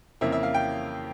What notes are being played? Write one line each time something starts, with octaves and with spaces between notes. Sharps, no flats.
F2 C#3 E3 A#3 E5
E5
F5
G5